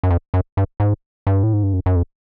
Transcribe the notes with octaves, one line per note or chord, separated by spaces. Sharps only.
F#2
F2
F#2
G2
G#2
G2
A2
G#2
G2
F#2
F#2
F2